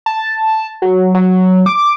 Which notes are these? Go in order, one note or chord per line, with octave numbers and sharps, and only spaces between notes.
A5
F#3
F#3
D6